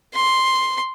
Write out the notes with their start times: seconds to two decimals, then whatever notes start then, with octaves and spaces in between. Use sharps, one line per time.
0.14 C6